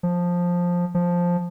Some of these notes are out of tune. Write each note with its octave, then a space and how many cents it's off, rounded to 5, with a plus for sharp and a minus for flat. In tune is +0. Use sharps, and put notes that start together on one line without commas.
F3 +10
F3 +5